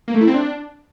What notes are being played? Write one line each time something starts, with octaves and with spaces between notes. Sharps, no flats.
A#3
A3
E4
C4
D4